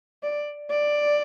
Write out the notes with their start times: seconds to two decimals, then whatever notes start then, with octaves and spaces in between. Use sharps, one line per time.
0.23 D5
0.70 D5